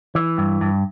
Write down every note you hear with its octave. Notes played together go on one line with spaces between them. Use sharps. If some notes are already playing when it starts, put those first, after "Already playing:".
E3
G2
G2